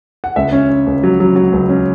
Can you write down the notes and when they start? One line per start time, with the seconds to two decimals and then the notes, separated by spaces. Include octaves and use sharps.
0.24 F#5
0.36 C#2 E5
0.52 C#4
0.69 C#4
0.87 C#2
1.03 F#3
1.20 F#3
1.36 F#3
1.52 C#2
1.69 C#4